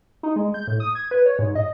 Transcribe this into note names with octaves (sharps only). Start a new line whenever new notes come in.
D#4
G#3
G6
A2
D#6
G#6
B4
C#5
G#2
D#5